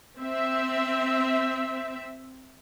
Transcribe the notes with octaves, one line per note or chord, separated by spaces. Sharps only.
C4 E5